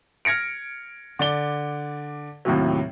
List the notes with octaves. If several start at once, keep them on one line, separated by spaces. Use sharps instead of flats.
F6 G#6 A#6 C#7 D7
D3 D5 G7
D#2 A2 C3 F#3